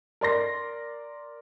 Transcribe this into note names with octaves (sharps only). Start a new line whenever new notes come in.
A#4 D5 C6 A#6